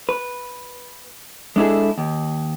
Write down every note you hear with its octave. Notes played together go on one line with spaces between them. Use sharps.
B4
G#3 D4 E4 G#4 A4
D#2